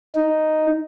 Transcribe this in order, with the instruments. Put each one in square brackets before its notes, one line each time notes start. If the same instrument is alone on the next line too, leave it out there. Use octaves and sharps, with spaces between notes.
[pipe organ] D#4